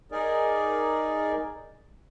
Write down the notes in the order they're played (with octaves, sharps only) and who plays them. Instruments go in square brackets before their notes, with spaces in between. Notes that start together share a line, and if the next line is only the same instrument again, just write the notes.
[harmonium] D#4 G#4 A#4 D5